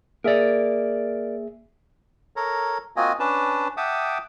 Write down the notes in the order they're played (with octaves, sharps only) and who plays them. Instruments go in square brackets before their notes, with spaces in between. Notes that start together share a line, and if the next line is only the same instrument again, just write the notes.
[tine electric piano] A#3 G#4 E5 [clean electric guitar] A#4 D5
[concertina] A4 A#4 C#5 A#5
A#3 C4 F4 F#4 D#5 G#5
C#4 D4 B4 A5
E5 F#5 G5 A5 D6 D#6